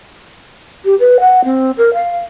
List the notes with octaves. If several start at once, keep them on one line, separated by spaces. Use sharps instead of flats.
G4
B4
F#5
C4
A#4
F5